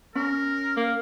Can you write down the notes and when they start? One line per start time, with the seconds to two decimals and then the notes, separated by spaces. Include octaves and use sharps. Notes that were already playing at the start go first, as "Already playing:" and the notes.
0.15 C#4 A#4
0.77 A#3